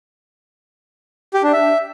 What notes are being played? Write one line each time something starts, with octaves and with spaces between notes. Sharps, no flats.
G4
D4
E5